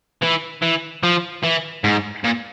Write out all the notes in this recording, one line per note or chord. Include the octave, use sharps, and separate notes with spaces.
E3
E3
F3
E3
G#2
A#2